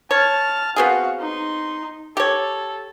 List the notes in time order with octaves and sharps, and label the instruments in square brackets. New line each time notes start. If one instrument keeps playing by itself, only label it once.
[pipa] C#5 [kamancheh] A5 F6
[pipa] B3 C4 G#4 [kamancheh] F#4 F5
[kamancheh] D#4 C6
[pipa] G4 C#5 [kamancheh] A4